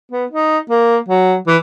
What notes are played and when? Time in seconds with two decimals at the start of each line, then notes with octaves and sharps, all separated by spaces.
0.11 B3
0.31 D#4
0.70 A#3
1.08 F#3
1.47 E3